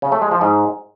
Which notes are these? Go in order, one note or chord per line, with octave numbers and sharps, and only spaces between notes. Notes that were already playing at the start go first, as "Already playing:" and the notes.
C#3
A3
G#3
F3
G#2